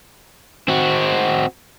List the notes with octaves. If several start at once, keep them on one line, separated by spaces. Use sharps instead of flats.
C4 F#4